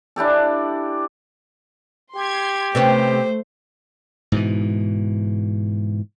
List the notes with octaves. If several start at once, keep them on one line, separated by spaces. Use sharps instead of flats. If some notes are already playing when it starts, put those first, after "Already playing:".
D4 E4 G4 A4
G4 C6 G#6
C3 A3 B3 C#4 C5
G#2 B2 E3